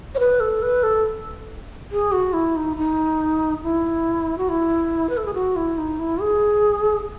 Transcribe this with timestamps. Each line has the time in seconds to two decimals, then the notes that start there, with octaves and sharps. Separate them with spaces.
0.15 C#5
0.19 B4
0.40 A4
0.62 B4
0.83 A4
1.91 G#4
2.12 F#4
2.33 E4
2.56 D#4
2.77 D#4
3.63 E4
4.38 F#4
4.49 E4
5.09 B4
5.17 A4
5.26 G#4
5.34 F#4
5.56 E4
5.78 D#4
5.99 E4
6.21 G#4